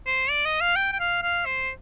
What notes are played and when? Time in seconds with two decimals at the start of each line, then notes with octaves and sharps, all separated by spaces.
0.07 C5
0.30 D5
0.45 D#5
0.61 F5
0.76 G5
0.92 G5
1.00 F5
1.23 F5
1.46 C5